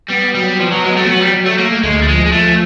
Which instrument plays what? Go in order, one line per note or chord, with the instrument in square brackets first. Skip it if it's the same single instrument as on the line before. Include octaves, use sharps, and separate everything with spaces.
[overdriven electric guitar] G3 [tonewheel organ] B3
[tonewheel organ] F#3 [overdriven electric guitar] G3
[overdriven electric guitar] F3 [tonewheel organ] B3
[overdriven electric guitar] F#3
[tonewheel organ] F#3 [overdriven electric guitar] G#3
[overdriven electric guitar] A3
C4
[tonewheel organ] F#3 [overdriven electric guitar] B3
[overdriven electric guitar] G3
[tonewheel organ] F#3
[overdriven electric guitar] A3
[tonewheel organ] A3 [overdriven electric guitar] A#3
[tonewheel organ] D2 [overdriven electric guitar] G#3
[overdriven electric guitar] G3
[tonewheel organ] F3 [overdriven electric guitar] G#3
[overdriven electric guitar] G#3
[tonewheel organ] F3 [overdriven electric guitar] A3